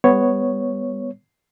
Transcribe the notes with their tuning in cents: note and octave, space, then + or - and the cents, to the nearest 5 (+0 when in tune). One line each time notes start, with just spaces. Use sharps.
G3 +40 B3 +10 C#5 +0